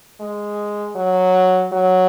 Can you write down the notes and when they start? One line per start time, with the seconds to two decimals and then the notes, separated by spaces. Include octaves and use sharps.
0.21 G#3
0.95 F#3
1.72 F#3